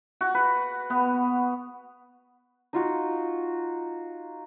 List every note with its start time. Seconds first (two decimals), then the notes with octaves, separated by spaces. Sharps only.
0.21 F#4
0.35 B4
0.90 B3
2.73 D#4 F4 F#4